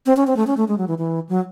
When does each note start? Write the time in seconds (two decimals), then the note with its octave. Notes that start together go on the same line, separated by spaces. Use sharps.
0.06 C4
0.17 C#4
0.27 C4
0.36 A3
0.47 C#4
0.57 A3
0.68 G#3
0.78 F#3
0.88 E3
0.98 E3
1.29 F#3